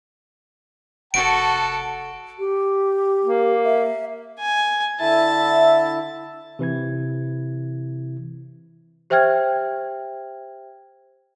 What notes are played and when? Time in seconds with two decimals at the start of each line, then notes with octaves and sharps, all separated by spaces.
1.14 F1 F#4 A4 F#5 A5 D7
2.39 G4
3.24 A#3
3.65 E5
4.39 G#5
5.00 D3 E4 E5 A5
6.59 C3 E3 E4 G#6
9.10 G4 C5 E5 G5 F6 G#6